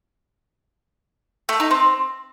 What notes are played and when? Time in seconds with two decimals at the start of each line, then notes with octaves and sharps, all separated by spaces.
1.49 A3
1.60 D#4
1.71 C4